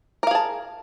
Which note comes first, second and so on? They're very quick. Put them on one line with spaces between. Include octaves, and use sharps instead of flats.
A#4 F5 G#4 A5